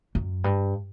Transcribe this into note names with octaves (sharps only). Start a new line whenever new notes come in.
F#2
G2